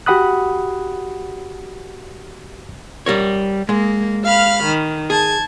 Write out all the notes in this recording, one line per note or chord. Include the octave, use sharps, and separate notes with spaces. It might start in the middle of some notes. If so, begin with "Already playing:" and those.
F#4 G4 F#5 B5 D#6 F#6
G3 A#4 C#5
G#3 A#3
F5 B5 F6
D#3
G#4 A5 G#6